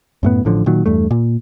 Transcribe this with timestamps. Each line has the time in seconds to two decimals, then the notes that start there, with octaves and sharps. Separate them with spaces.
0.23 F#2 A2 B3
0.45 A1 A2 D3 F3
0.66 A#2 D#3 F#3
0.86 E2 G2 A3
1.11 A#2